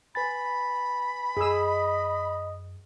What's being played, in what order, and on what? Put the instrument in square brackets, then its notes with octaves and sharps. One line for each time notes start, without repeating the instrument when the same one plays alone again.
[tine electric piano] B4 G#5 A6 [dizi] B5
[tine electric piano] F#2 [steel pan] G#4 E6 [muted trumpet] D#5